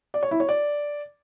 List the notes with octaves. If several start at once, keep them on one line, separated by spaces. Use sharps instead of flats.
D5
C#5
E4
C#5
D5